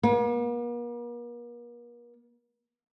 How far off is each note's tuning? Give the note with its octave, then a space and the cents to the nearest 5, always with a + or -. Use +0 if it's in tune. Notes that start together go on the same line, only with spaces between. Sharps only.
A#3 +45